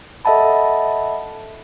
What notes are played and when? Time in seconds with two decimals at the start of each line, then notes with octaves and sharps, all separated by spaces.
0.25 A4 D#5 E5 F#5 A5 B5